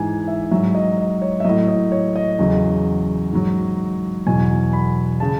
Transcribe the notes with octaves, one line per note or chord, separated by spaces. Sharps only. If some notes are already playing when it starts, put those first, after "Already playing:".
Already playing: G#2 E3 G#5
E5
G#2 F#3 E5
D#5
D#5
C#5
E5
A2 F#3 D#5
D#5
C#5
D#5
E2 C#3 F#3
G#2 F#3
E2 B2 F#3 G#5
B5
C#3 A5